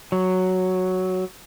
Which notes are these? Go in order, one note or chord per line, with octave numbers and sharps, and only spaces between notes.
F#3